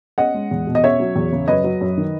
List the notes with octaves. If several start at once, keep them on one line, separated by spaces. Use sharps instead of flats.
C#4 D#5 F#5
G#3
E2
B2
D#5
C#4 C#5 E5
F#3
E2
C#3
F#2 B4 D#5
F#3
F#2
D#3